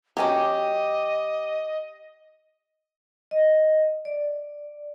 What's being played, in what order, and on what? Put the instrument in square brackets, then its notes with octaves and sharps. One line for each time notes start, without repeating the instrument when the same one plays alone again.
[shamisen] F#3 C#4 [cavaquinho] G4 G5 D6 [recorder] D#5
[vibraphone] D#5
D5